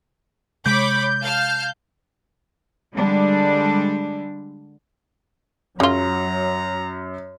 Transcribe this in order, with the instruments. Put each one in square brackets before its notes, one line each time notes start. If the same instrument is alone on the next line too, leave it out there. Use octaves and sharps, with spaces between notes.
[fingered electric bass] C3 G#3 [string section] C#5 B5 D6 [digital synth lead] G6
[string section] F5 A5 F6
[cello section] D3 G3 G#3 D4
[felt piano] F#2 [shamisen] C#3 F4 [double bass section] F#3 [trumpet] A#5